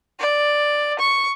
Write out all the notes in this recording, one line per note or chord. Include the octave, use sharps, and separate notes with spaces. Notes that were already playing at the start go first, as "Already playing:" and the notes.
D5
C#6